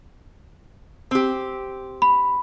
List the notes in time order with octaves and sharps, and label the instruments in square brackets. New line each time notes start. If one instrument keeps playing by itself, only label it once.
[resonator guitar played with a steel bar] C4 G4
[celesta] B5